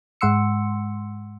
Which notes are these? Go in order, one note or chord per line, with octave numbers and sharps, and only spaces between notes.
G#2 G#3 F#5 C6 E6 C#7